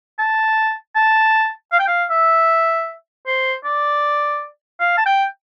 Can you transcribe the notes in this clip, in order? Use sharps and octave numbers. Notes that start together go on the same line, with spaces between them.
A5
A5
F5
G5
F5
E5
C5
D5
F5
A5
G5